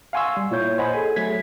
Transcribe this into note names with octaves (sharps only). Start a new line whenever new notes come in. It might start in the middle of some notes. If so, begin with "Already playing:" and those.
F5 F#5 G#5 C6 C#6 E6
G3
A#2 E4 C#5 G6
C5 D#5 F#5 G#5 B5
G#4 A4 G#5
F#3 A3 G#6 B6